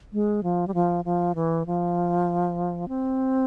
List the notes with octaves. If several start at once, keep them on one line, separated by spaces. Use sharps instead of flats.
G#3
F3
G3
F3
F3
E3
F3
C4